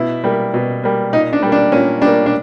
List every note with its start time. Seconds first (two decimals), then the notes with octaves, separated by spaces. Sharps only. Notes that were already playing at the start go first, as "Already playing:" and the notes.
Already playing: B2 E4
0.24 G3 A#3
0.54 B2
0.83 G3 A#3
1.13 A#2 D#4
1.33 D4
1.42 G3 A#3
1.52 D4
1.72 A#2 C#4
2.02 G3 A#3 D4
2.26 D4